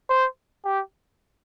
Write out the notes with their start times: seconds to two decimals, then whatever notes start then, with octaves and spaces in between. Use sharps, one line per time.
0.10 C5
0.64 G4